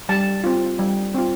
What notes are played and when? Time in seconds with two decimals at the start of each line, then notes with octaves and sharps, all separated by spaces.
0.09 G3 A5
0.44 C4 F4
0.79 G3
1.14 C4 F4